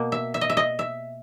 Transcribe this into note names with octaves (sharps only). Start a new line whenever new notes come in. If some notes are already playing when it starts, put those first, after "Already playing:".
Already playing: B2 A#3
E5
E5
D#5
E5
D#5
E5